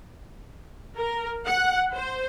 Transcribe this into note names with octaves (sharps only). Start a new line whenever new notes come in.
A#4
F#5
C5